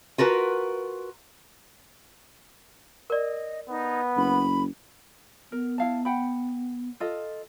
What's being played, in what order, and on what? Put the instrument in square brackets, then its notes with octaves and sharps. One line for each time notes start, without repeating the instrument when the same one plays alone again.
[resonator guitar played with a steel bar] F4 F#4 A#4 B4
[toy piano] A#4 D5 [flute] D#5
[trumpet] B3 [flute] D#4
[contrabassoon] F#1 [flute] B5
[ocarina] B3 [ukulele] A#4
[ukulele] E4 F5 A5
F#5 G5 B5
F4 A4 D#5